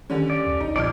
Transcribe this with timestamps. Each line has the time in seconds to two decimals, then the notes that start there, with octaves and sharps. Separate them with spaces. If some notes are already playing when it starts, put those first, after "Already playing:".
0.10 D3 D#3 G3 C#4
0.30 D5
0.47 D2
0.61 A#1 D#4
0.76 F2 A#2 D5 F6